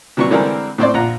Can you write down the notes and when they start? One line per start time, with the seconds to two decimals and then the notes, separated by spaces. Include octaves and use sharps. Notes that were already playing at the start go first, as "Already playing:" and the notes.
0.17 C3 E3 F#3 G3 C#6
0.31 D3 E3 G3 G#3 C4 A#4
0.78 A2 C4 C5 D5
0.94 A#1 F4 F#5 A#5